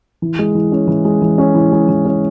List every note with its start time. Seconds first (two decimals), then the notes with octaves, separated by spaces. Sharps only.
0.22 E3
0.39 G#3
0.55 E3
0.72 C#4
0.88 E3
1.05 G#3
1.22 E3
1.38 C#4
1.55 E3
1.72 G#3
1.88 E3
2.05 C#4